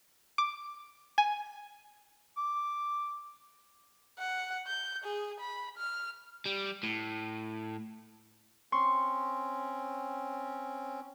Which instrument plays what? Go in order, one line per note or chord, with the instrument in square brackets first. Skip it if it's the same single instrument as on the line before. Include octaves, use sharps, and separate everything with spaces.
[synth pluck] D6
G#5
[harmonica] D6
[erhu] F#5
G6
G#4
B5
F6
[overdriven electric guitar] G3
A2
[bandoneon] C4 C#4 [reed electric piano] C6 C#6